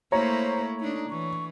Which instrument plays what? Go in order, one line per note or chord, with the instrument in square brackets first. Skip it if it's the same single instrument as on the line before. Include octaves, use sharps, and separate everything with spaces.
[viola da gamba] A3 A#3 E4 [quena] C5 [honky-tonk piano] C#5 A#5
[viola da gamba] A3 D4 [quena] D#4
[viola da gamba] E3 [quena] C#6